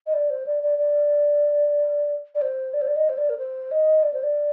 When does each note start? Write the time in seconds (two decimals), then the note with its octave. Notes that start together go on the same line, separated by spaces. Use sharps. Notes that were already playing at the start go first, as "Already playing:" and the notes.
0.06 D#5
0.13 D5
0.29 C5
0.46 D5
0.63 D5
0.78 D5
2.35 D5
2.41 C5
2.73 D5
2.81 C5
2.87 D5
2.96 D#5
3.09 C5
3.17 D5
3.29 A#4
3.38 C5
3.71 D#5
4.03 D5
4.13 C5
4.23 D5